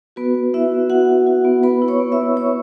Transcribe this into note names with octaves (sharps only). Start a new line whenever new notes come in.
B3 F#4 B4
B3
B3 E4 E5
F#4
B3 F#4 F#5
F#4
F#4
B3
B3 B4 B5
E4
C#5 C#6
B3
E5 E6
B3
E4 C#5 C#6